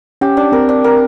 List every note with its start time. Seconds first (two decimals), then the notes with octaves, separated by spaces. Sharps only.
0.21 C#4 G4
0.37 D4
0.52 C4 A#4
0.69 D4
0.84 A#4